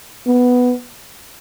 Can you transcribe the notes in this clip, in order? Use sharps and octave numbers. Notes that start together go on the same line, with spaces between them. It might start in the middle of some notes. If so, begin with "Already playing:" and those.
B3